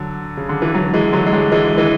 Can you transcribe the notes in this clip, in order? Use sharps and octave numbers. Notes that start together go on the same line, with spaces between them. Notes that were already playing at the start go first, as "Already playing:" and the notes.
Already playing: D3 F#3
C#3
D3
E3
D3 F#3
E3 G#3
D3 F#3
G#3
D3 F#3
E3 G#3
E3 G#3